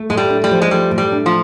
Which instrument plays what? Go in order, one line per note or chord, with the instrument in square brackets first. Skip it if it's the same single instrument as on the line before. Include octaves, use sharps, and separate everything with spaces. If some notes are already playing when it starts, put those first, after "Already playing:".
Already playing: [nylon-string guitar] A3
[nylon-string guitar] A2 [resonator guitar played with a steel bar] G#3
[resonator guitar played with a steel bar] G3
[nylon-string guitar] D4
[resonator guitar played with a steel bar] G3
[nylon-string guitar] F3
[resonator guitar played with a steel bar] G#3
[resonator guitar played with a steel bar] G3 [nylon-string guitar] A3
[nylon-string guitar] A2
[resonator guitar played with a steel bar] G3
[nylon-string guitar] D4
[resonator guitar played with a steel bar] F3